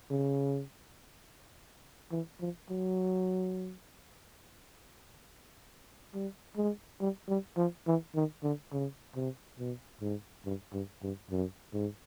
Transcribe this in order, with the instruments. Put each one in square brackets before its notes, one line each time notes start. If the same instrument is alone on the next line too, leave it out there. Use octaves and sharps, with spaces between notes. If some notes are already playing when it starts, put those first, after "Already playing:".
[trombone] C#3
E3
F3
F#3
G3
G#3
G3
G3
F3
E3
D#3
D3
C#3
C3
B2
G#2
G2
G2
G2
F#2
G#2